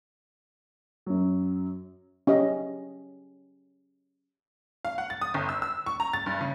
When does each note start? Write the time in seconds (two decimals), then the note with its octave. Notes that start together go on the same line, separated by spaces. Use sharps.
1.06 F#2 F#3
2.27 C#4 G4 D#5
4.85 F5
4.98 F#5
5.10 A6
5.21 D#6
5.34 G1
5.49 E6
5.62 E6
5.86 C#6
6.00 A#5
6.13 A6
6.26 G2
6.41 C#3